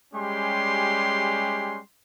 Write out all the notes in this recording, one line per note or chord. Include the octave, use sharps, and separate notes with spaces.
G3 G#3 C#4 G4 C6